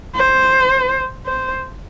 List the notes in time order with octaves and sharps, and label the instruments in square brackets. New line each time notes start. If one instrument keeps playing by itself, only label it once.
[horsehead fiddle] C5
C5